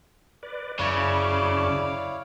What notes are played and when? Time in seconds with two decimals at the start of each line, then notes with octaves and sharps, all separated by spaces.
0.43 B4 D5
0.79 F#2 C#3 E4 C#5 D5 F5 A5